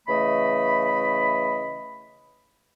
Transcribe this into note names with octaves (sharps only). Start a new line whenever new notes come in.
C#3 E3 A3 D#5 B5